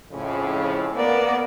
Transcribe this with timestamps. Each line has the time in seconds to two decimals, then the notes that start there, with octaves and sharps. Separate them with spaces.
0.12 F2 A2 C#3
0.96 A#3 B3 D5